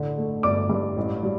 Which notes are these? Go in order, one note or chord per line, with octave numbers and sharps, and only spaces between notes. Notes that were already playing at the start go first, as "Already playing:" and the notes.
Already playing: A1 D3
A3
G1 D5 D6
G2
A1
G3